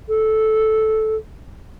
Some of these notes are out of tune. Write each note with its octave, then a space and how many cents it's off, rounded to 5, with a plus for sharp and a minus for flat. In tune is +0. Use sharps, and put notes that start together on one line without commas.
A4 -10